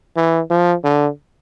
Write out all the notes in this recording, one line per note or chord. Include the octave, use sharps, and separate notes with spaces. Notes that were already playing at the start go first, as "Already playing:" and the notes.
E3
F3
D3